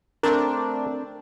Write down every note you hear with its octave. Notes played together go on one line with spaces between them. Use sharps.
A3 C4 D4 A#4